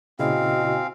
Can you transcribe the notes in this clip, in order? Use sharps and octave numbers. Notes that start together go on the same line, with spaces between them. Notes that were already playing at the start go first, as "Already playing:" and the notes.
A#2 C#3 C4 E4 F#4 D#5 F5 G#5